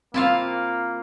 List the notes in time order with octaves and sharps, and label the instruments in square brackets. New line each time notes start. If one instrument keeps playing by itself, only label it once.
[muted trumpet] A#3 [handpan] C4 [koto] E4 F4 F5